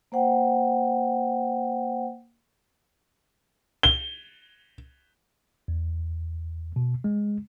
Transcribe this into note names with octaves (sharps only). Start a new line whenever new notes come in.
A#3 C5 F#5 G5
G7
E2
B2
G#3